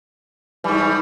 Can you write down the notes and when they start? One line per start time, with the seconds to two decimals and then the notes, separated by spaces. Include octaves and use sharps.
0.64 G#2 E3 G3